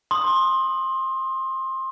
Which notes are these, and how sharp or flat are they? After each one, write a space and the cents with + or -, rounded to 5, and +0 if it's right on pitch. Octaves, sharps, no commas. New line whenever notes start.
C6 +20 D#6 -10